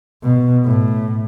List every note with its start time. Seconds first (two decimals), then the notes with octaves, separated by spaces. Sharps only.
0.23 B2
0.64 A2